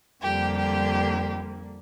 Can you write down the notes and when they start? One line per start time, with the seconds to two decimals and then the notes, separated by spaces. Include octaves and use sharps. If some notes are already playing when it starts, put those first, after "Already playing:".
0.23 F2 D3 G3 A#3 G4
0.56 G4